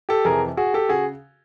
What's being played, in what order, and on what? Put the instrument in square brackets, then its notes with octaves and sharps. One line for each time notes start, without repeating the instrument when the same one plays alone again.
[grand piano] G4 A4
F2 C3 E3 G#4 A#4
F#4 G#4
G4 A4
C#3 F#4 G#4